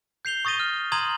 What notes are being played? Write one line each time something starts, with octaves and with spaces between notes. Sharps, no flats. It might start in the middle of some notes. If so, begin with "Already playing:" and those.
G6 C7 F7 G7
C#6 D#6 A6 A#6 D#7 G7
F6
A#5 C6 D#6 G#6 D#7 F#7